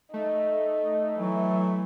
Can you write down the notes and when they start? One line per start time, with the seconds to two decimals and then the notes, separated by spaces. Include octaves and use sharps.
0.14 A3 D#4
1.18 E3 F#3